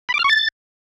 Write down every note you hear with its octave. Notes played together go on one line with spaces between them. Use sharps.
B5
D6
F6
C#6
A6